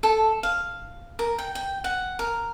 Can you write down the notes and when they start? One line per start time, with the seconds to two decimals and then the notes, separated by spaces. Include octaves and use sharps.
0.03 A4
0.43 F5
1.19 A#4
1.38 G5
1.55 G5
1.84 F#5
2.19 A#4